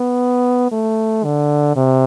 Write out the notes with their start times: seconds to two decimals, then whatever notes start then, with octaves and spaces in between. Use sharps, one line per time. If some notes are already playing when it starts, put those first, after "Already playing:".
Already playing: B3
0.72 A3
1.24 D3
1.76 C3